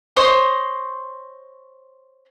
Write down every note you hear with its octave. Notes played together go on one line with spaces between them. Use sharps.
C5 C#5 D#5 C6